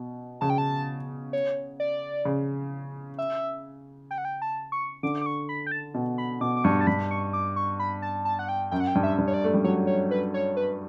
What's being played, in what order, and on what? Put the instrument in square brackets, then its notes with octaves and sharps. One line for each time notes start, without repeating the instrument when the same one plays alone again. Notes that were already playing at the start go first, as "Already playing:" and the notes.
Already playing: [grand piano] B2
[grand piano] C#3 [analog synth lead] A5
[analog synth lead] G5
A5
C#5
D5
[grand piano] C#3
[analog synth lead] E5
G5
F#5
G5
A5
C#6
[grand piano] D3 [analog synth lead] D6
[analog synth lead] D6
C#6
B5
G5
A5
[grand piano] B2
[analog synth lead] B5
[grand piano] B2 [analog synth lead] D6
[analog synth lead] D6
[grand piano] G2 [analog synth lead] C#6
[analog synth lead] A5
[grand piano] G2 [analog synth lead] B5
[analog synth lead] C#6
D6
C#6
B5
A5
A5
F#5
G5
[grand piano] F#2 [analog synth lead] G5
[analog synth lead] F#5
G5
[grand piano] G2
[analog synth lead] E5
[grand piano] G2
[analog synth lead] C#5
D5
[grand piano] A3
G3
[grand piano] F#3 [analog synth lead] C#5
[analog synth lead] C#5
B4
C#5
B4